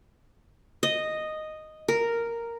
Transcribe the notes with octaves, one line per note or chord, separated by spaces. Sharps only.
D#5
A#4